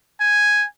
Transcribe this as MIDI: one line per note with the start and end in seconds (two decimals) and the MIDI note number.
0.20 0.66 80